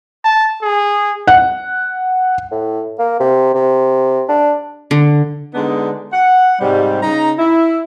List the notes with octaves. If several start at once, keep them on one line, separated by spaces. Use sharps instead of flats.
A5
G#4
F#5
A2
A#3
C3
C3
D4
D3
D3 G#3 B3 D4 D#4
F#5
G#2 C3 G3
C#3 D#4 A#5
E4